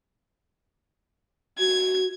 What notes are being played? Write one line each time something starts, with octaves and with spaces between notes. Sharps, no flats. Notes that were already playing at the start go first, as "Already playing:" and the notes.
F#4 G#6